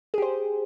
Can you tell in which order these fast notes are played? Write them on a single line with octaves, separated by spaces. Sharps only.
G#4 G4 C5